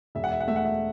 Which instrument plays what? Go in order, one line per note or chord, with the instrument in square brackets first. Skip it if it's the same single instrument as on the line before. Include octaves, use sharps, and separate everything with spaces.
[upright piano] E1 E5
F#5
E5
F#5
A3 E5
F#5
E5